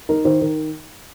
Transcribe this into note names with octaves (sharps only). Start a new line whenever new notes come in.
D#4 A#4
D#3 C5
D#3 A#4